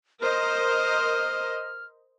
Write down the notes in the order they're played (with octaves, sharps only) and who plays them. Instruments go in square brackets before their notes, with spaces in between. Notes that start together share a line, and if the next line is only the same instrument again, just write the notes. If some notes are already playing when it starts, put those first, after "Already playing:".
[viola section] A#4 C5 D#5 [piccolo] F6